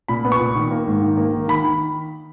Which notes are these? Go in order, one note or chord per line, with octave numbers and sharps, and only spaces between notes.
A#2 B5
B3
C#6
A#2
D#3
A#3
G#2
D#3
A#3
D#3
D#3 B5
D#3